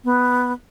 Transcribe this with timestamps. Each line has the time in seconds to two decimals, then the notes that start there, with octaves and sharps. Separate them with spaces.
0.04 B3